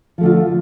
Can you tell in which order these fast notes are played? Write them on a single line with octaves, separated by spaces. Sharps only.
F3 A3 D3 F4